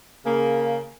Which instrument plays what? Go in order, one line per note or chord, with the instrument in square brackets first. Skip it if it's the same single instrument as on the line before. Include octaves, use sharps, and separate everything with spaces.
[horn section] C#3 A#3